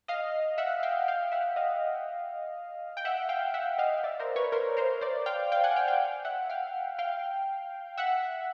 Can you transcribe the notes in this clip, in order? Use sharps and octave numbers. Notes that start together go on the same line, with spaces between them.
D#5 F5
E5 F#5
F5 G5
F5 G5
E5 F#5
D#5 F5
G5
E5 F#5
F5 G5
E5 F#5
D#5 F5
D5 E5
A#4 C5
B4 C#5
A#4 C5
A#4 C5
C5 D5
F5 G5
F5 G5
F#5 G#5
F5 G5
F5 G5
E5 F#5
F5 G5
F5 G5
E5 F#5